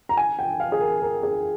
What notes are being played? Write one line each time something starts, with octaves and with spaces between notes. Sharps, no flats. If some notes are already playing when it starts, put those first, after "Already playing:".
A#5
G#5
G5
F5
G#4
A#4
A#4
G#4